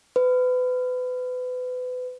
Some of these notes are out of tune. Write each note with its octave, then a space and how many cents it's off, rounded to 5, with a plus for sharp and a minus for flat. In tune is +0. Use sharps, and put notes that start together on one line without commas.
B4 +30